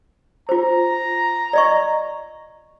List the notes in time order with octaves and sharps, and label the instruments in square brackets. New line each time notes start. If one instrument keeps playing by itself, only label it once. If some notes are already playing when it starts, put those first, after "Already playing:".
[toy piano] F4 C5 [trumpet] A#5
[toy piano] D5 D#5 C#6